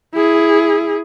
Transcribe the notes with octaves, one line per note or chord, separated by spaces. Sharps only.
E4 G#4